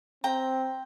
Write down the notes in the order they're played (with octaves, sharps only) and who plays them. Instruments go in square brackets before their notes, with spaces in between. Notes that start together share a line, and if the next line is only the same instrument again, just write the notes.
[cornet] C4 [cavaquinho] G5 A#5